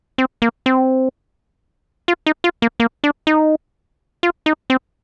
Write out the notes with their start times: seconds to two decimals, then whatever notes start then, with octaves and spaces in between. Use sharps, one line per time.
0.18 C4
0.42 A#3
0.66 C4
2.08 F4
2.26 D#4
2.44 F4
2.62 A#3
2.80 A#3
3.04 D4
3.27 D#4
4.23 F4
4.46 D#4
4.70 C4